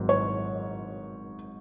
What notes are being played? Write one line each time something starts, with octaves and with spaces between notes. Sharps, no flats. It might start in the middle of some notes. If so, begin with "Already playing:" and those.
Already playing: G#1 G#2 D#3 F#3
C#5